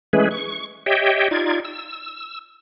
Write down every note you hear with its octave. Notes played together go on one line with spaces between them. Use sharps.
E3 G#3 A3 C#4 G#4 B4
C#6
G4 C#5 D#5 E5 G5
D#4 F4 D5 G#6
E6